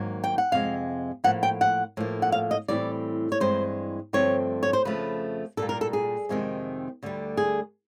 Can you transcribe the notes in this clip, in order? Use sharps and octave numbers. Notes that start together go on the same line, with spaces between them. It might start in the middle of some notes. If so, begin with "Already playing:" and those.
Already playing: G#2 D#3 F#3 A#3
G5
F#5
F2 C3 G#3 F5
A2 F3 A#3 F#5
G5
F#5
A2 F3 A#3
F#5
F5
D#5
A2 E3 G3 C4 D5
C#5
G2 E3 G#3 C4 C5
G2 D3 F3 A3 C4 C#5
C#5
C5
F2 C#3 F3 A3 B4
A#2 G3 A#3 A4
A#4
A4
G#4
F2 C3 D#3 G#3 C4
D2 D3 G3
G#4